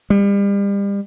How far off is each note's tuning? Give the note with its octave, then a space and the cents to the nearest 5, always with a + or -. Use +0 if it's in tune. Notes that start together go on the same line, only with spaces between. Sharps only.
G3 +35